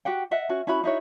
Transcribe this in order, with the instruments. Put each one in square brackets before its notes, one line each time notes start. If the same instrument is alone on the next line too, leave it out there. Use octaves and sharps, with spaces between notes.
[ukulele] F#4 G4 F#5 G5
D#5 E5 F#5
C#4 F#4
C#4 E4 F#4 B5
D#4 E4 F#4 C#5